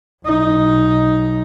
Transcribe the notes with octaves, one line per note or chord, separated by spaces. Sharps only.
B1 D#4